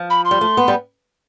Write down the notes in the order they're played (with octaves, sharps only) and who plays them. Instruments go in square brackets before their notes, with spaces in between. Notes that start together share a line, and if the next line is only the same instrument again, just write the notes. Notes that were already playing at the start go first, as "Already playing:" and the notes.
Already playing: [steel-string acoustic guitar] F3
[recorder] B5
C6
[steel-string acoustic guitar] G3
A3
B3
G3